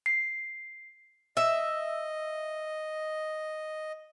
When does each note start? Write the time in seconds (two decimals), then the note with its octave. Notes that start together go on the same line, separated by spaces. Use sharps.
0.06 C7
1.37 D#5 E5